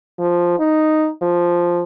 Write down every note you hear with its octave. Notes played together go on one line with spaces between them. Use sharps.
F3
D#4
F3